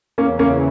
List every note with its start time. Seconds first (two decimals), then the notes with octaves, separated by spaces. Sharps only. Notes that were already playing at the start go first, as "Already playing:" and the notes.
0.18 E2 C#3 E3 A#3 C#4
0.39 A#3 C#4